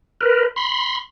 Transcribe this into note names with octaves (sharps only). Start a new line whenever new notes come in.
A#4 B4
B5 C6